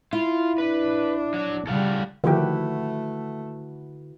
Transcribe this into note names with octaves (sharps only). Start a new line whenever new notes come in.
E4 F4
D4 B4
F#3
C#3 G3 A4 F5 F#5
D3 D#3 F3 A3 E4 F#4 G4 B4